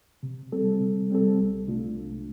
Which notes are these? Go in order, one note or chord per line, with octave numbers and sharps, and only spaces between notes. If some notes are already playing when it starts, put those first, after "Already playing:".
C3
G3 C4 A4
C3
G3 C4 A4
C2
C3 A3 D4 F4
C2